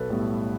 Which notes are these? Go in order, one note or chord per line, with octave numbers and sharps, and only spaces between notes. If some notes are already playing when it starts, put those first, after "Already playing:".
Already playing: B1 A4 B4
A2 G3 B3